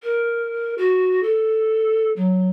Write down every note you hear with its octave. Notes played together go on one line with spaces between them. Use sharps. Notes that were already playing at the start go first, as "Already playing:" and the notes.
A#4
F#4
A4
F#3